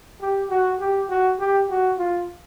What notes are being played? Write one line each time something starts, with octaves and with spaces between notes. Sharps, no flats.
G4
F#4
G4
F#4
G4
F#4
F4